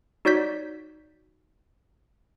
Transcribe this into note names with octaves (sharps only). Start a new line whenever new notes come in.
D#4 F#4 C#5 D5 G6 B6